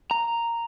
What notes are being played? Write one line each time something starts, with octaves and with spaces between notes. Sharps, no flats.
A#5